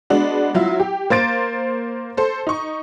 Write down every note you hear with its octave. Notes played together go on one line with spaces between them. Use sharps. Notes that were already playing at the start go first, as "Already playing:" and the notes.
G#3 B3 D4 F#4
F#3 E4 F4
G4
A#3 C5 A6 D7
A4 C5
D#4 C#6